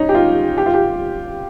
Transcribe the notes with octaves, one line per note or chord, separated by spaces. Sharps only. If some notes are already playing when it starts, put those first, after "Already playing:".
Already playing: C#4 D#4
G4
F4
G4
F4
G4